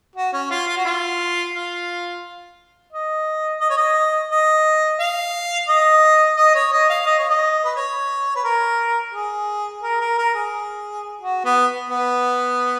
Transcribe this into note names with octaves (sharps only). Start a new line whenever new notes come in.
F#4
C#4
F4
F4
F#4
F4
F4
D#5
D#5
C#5
D#5
D#5
F5
D#5
D#5
C#5
D#5
F5
D#5
C#5
D#5
B4
C#5
B4
A#4
G#4
A#4
A#4
A#4
G#4
F#4
B3
B3